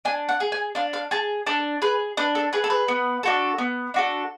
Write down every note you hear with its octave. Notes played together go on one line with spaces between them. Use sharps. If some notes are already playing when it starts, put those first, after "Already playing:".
D4 G#5
F#5
G#4
G#5
D4 F5
F5
G#4 A5
D4 A4
G#4 B4
D4 B4
A4
G#4 B4
A4
B4
B3
D4 F#4 A4
B3
D4 F#4 A4